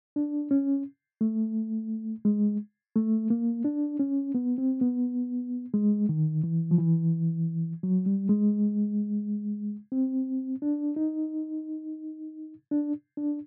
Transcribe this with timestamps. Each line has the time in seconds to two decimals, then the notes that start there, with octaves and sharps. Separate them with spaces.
0.16 D4
0.51 C#4
1.21 A3
2.25 G#3
2.96 A3
3.30 A#3
3.65 D4
3.99 C#4
4.35 B3
4.58 C4
4.81 B3
5.74 G#3
6.09 D#3
6.44 E3
6.71 F3
6.78 E3
7.83 F#3
8.06 G3
8.29 G#3
9.92 C4
10.62 D4
10.96 D#4
12.71 D4
13.17 D4